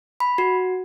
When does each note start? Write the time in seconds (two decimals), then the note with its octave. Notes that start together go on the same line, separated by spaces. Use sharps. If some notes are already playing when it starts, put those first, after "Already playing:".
0.20 B5
0.38 F#4